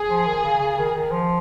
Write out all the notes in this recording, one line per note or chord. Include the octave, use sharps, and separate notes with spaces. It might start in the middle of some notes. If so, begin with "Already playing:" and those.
Already playing: G#4
F3
D#3
C#3
C#3
D#3
D#3
F3